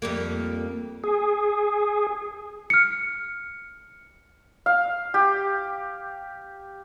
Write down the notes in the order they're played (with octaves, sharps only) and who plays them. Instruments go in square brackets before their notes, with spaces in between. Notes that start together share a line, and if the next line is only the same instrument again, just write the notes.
[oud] F2 G3 A#3
[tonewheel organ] G#4
[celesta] F6 C#7
[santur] F5
G4